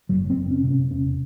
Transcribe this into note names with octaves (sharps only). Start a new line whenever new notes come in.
F#1 F#3
C4
F#1
C#4
C3
C#4
E1 C#4